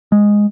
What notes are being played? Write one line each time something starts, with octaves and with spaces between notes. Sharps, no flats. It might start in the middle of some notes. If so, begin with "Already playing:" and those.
G#3